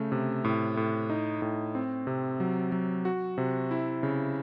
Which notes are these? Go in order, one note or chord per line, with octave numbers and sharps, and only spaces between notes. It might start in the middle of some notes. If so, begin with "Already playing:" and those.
Already playing: C#3 A3
C3
A2
A2
D#4
A2
C4
C3
F#3
F#3
F#4
C3
E4
C#3